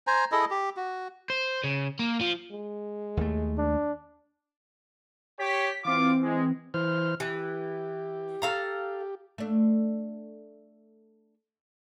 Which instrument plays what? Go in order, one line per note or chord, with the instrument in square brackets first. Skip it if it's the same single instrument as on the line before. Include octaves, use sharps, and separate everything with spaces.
[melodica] C5 G#5 A#5
E4 G#4 A4 D#5
G4
F#4
[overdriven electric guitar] C5
C#3
A#3
F3
[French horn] G#3
[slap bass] D#2 A3
[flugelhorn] D4
[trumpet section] G4 C#5 [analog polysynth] B6
[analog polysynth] E3 C4 [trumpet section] F4 D6
[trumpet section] G#3
[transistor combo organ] E3 C5 F6
[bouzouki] E3 [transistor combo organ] G4
[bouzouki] A4 F5 A#5
[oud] A3 D4